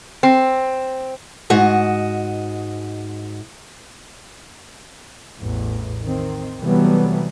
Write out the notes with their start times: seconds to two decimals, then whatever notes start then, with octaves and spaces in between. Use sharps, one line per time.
0.23 C4
1.50 G#2 F#4 D#5
5.40 A1 E2 A2
6.04 D#3 C4
6.61 C3 E3 F#3 G3 A3 B3